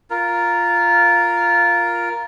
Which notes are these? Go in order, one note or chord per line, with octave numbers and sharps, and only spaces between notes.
F4 A#4